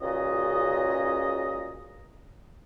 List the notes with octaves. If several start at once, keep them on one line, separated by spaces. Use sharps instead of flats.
C#2 A#2 C#3 F#4 D#5